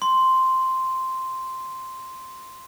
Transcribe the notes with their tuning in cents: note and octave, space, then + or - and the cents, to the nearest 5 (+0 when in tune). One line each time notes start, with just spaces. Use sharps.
C6 -5